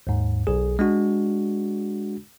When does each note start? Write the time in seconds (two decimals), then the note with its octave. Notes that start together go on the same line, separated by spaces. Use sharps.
0.07 D#2 G#2
0.47 B1 G#4
0.79 G#3 D4 F#4